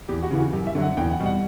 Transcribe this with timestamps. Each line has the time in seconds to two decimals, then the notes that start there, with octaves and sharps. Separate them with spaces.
0.08 E2 G4
0.23 F#4
0.31 C#3 E3
0.39 F#4
0.53 F#2 G4
0.67 E5
0.75 D3 F#3
0.82 F#5
0.97 E2 G5
1.11 F#5
1.20 B2 G3
1.26 F#5